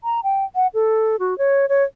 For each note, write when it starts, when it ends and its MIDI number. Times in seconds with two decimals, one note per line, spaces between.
0.04 0.21 82
0.24 0.45 79
0.55 0.67 78
0.74 1.16 69
1.20 1.37 66
1.38 1.66 73
1.69 1.84 73